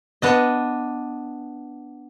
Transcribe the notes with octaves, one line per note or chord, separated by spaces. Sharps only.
B3 D4 D#5